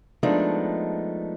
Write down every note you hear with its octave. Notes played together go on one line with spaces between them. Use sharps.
F3 G#3 A3 B3 D4 D#4